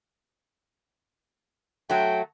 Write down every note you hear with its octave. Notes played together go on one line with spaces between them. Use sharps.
F#3 A3 G5